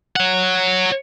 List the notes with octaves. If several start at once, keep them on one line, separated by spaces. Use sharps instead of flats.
C#5 F#5